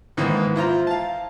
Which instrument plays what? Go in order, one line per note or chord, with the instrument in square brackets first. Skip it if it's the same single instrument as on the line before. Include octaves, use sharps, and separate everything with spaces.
[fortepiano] G#2 D#3 E3 A#3 B3
E4 F4 C5 A#5
F5 A5